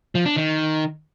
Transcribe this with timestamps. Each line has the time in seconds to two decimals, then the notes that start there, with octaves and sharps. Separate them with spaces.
0.15 F3
0.25 D4
0.36 D#3